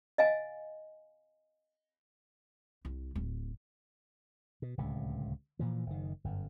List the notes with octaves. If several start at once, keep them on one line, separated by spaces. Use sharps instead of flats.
D#5 F5 G#5
C2
D1
B2
D1 C#2 C3
A#2 E3 F3
F#1 D#3
G1 F#2